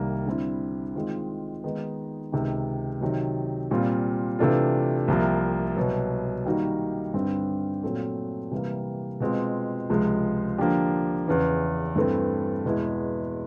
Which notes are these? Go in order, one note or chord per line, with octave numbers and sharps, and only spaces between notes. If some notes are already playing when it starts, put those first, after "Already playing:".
Already playing: C2 C3 D#3 G3 A#3
D3 G3 C4 E4
D#3 G#3 C4 F4
D#3 G#3 B3 D#4
C#2 C3 D#3
C3 D#3 F#3
A#2 G3 C4 F4
C3 E3 A3 D4 F4
C2 C3 F3 A#3
C2 B2 F#3
D#3 G3 A#3 D#4 F#4
G2 D3 G3 C4
A#2 F#3 A3 C4
C3 E3 G3 A#3
B2 G#3 C4 F4
C#2 C3 F3 G#3
D3 F3 A#3 D4 G4
E2 C#3 E3
G2 E3 A3 C4
E2 B2 G#3 B3 E4